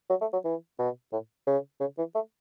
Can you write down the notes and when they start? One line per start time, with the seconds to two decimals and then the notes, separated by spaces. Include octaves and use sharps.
0.10 F#3
0.21 A3
0.33 F#3
0.45 E3
0.79 B2
1.12 A2
1.47 C#3
1.80 C#3
1.98 E3
2.15 A3